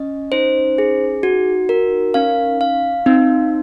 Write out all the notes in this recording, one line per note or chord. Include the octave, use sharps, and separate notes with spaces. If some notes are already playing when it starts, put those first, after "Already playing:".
Already playing: C#4 D#5
D#4 C5
G#4
F#4
A#4
C#4 F5
F5
C4 D#4